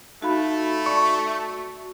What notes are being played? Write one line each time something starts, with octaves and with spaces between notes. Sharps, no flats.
A3 D#4 F#4 F5 B5
D5 A5 C#6